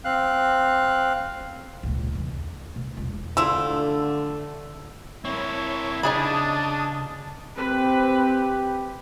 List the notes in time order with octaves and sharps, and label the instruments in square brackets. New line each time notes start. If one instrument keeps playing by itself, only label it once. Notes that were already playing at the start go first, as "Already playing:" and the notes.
[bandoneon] C4 F5 F#6
[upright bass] C#2 A#2
E2 C#3
D3
B2
E1 F4
[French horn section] D3 [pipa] A3 E4 F4 [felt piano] E6
[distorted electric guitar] C4 A#4 [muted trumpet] E4 [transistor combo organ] C#5
[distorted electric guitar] C#3 C#5 [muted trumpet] D4 [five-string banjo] D#4 G#4 B5 [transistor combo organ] A5 D#6
[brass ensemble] C4 [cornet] G4 [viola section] B4